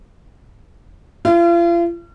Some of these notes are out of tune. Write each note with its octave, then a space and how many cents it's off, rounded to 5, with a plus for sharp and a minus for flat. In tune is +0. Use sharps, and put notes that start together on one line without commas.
F4 -40